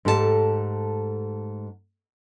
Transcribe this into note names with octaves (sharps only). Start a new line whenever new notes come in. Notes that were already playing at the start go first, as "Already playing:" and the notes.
G#2 A3 G4 A4 A#4 A5